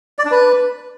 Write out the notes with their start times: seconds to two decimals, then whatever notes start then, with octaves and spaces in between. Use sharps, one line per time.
0.19 D5
0.25 D4
0.32 B4